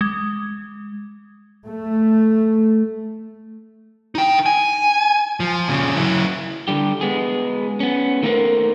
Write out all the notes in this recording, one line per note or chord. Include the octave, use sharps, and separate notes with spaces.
G#3
A3
D#4 G5
G#5
F3
A#2 C#3
F#3 E4
D3 G3 G4
G#3 B3 G#4
B3 C#4
D#3 A3 A#3 C4 A#4 C5